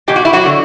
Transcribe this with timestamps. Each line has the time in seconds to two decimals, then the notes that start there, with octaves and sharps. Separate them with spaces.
0.08 E2 B2 G4
0.16 F#4
0.25 E4
0.33 F#3 F#4
0.45 D3